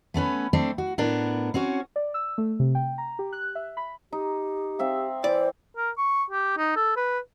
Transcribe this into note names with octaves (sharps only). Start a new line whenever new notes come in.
A3 B3 C#4 B4
A3 C4 D4
F#4
A2 B3 D4 A#4
C4 C#4 F#4 C#5
D5
E6
A3
C3
G5
A#5
G4
F#6
E5
B5
D#4 G4
C4 E5 F5
E3 C5 D5
A#4
C#6
G4
D#4
A4
B4